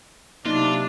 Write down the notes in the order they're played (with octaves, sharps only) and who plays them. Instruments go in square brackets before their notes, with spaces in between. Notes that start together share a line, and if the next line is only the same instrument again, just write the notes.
[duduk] C3 [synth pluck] F#3 A#3 D#4 [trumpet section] D4 [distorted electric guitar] F4